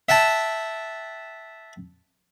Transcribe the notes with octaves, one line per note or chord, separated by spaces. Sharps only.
E5 F#5 G5 A5